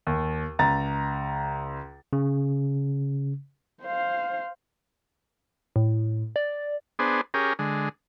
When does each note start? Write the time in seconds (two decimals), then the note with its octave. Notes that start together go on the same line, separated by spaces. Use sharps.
0.07 D#2
0.59 C#2 A#5 A6
2.13 C#3
3.82 C5 F5
5.76 A2
6.36 D5
6.99 B3 D4 G#4 C5
7.34 C#4 G4 G#4 A#4
7.59 D3 G#3